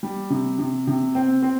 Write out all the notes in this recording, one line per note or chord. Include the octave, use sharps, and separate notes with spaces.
G3
C3
C3
C3
C4
C4